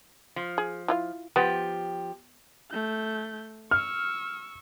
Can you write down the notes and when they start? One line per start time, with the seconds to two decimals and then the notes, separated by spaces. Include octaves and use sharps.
0.36 F3
0.58 G#4
0.88 E4 F4 F5
1.36 F3 B3 G4
2.71 A3 G6
3.71 C#6 E6 F6